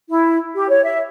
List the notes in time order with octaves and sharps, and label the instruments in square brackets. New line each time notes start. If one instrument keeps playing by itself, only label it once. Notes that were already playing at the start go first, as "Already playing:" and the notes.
[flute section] E4
G4
C#5
E5